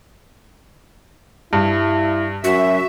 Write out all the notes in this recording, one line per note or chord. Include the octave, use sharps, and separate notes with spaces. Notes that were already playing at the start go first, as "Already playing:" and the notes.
G2 E4
F#2 F#4 E5